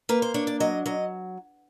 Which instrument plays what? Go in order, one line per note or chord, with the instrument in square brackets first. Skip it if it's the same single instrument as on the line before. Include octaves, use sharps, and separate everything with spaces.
[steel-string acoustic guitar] A#3 B4
C5
D4 C#5
D5
F#3 D#5
F#3 D#5